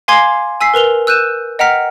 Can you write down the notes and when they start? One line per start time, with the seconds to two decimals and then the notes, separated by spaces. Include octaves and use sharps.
0.08 F5 G#5 C6 D6 G#6 C7
0.61 G#5 E6 B6 C7
0.74 A#4 B4 F7 G7
1.07 E6 F#6 G6 D#7 E7
1.59 D#5 F#5 G5 A#5 F6 B6